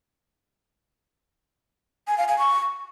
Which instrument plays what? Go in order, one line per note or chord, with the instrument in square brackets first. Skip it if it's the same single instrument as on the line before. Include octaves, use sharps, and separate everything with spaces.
[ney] G#5
F5
G#5
C#6